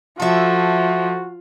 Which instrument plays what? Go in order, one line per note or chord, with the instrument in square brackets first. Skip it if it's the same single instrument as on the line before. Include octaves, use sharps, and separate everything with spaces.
[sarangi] F3 [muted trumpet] F#4 [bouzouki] A4 E5